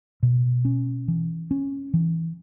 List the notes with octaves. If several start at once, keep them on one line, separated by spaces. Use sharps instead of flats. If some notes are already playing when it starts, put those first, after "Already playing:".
B2
C#4
E3
C#4
E3